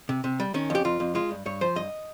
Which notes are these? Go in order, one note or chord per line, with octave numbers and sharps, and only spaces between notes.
C3
C3
G3
D#3 C#4
F2 G4
F2 F4
F2
G#3 F4
G2
G2 C#5
F3 C5
G2 D#5